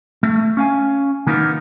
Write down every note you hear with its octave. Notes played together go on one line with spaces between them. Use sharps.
A3
C#4 F5 G#5
D#3 A#3 B3 D#4 F4 A#4